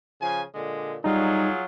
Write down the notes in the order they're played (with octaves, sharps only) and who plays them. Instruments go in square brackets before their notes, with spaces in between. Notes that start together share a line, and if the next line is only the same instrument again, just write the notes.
[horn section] C#3 F3 G#5
A#2 D3 G#3
[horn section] F#3 F4 G#4 [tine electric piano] G3 D#4